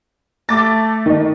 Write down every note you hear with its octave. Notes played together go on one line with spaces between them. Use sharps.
A3 D6 A6
D#3 D#4